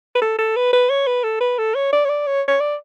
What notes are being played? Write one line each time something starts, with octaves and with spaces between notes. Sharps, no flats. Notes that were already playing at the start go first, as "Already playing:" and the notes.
B4
A4
A4
B4
B4
C#5
B4
A4
B4
A4
C#5
D5
C#5
D5
C#5
C#5
D5